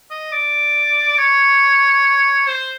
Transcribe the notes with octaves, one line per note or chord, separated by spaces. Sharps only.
D#5
D5
C#5
C5